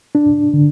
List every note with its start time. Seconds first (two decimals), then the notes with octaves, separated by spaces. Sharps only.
0.15 D4
0.54 D3